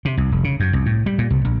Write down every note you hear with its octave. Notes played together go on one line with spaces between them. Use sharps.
C3
C2
F1
C#3
F#2
C2
A2
G3
A#2
C2
A#1